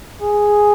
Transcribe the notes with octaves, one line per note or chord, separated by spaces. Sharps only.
G#4